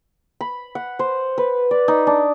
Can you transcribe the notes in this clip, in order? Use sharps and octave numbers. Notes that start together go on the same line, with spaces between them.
B5
F#5
C5
B4
D5
D#4
D4